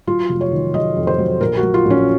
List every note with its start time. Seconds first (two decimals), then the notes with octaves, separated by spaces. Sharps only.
0.07 F#3 F4
0.29 F1
0.41 C#5
0.52 D#3
0.74 F#3 D#5
0.96 F2
1.07 C5
1.18 F#3
1.41 A#1 A#4
1.57 F#4
1.63 F#3
1.74 F4
1.85 A#1
1.90 C#4